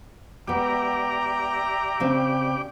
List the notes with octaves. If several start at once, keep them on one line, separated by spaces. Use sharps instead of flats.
G#3 B3 G4 D5 E5 A#5 D6
C#3 C4